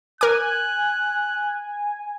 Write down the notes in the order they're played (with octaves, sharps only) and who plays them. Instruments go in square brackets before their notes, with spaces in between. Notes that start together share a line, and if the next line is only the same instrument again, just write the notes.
[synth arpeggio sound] A#4 D6 [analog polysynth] G#5 [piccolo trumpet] F#6